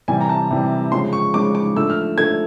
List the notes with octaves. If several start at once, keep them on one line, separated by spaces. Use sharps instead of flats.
C3 E3 G3 G#5
A#5
A5
C3 E3 G3
C#3 F3 G#3 C6
C#6
C#3 F3 G#3 D6
D6
D3 F3 A3 E6
F6
D3 F3 A3 G#6